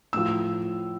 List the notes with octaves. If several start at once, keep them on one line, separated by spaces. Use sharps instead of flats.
A2 F3 E6